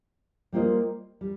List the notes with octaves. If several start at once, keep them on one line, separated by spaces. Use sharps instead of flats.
G3 A#3 F4 C5 D#5
G3